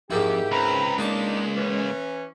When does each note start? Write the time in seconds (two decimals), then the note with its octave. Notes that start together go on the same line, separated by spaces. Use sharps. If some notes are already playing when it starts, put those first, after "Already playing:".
0.10 F2 G#2 A#3 E4 G4
0.52 C#2 C4 B4 A#5 B5
0.98 G#3 A#3 D4 D#4 A5 D6
1.56 E3 C#4